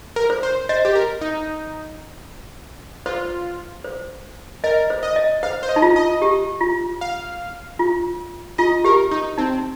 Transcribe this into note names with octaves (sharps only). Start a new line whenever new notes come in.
A#4
C5
C5
C5 D#5
G4
A#4
D#4
F4 C5
C5
A#4 D#5
C5
D#5
D#5
C5 F5
C5
D#5
D#4
F4
D#5
G4
F4
F5
F4
F4 D#5
G4 A#4
D#4
C4 D#4